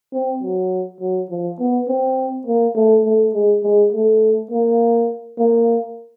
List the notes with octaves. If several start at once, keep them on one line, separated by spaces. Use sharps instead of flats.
C4
F#3
F#3
F3
B3
C4
A#3
A3
A3
G#3
G#3
A3
A#3
A#3